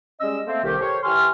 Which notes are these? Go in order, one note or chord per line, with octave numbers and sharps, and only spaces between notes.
G3 G#3 C#4 D#5 E6
A3 A#3 C4
C2 D#3 G4
G4 A4 A#4 C5 C#5
E3 G4 G#5 C6 C#6 F6